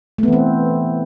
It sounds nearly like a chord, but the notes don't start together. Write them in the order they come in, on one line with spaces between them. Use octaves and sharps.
A3 B3 E3 C4